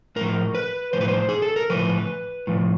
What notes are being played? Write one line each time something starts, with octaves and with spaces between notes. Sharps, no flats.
A2 F3 A#4
B4
A2 F3 C5
B4
C5
G#4
A4
A#4
A2 F3 B4
A2 F3